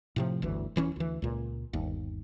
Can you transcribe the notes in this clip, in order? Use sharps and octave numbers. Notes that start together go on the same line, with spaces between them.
A2 C3 F3
G1 D2 E3
D#1 E3 C4 C#4
D2 E3
C#2 A#2
G1 D#2